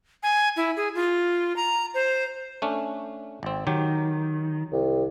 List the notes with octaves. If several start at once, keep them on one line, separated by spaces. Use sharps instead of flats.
G#5
E4
G#4
F4
A#5
C5
A3 C#4 D4
G#1 C4
D#3 F#3 G4
C2